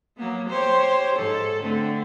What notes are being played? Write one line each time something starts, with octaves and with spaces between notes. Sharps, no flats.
F#3 A#3 B3
G4 C5 C#5
G#2 A4
D3 A3 C4